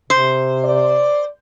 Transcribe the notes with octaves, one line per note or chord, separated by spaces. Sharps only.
C3 C5
D5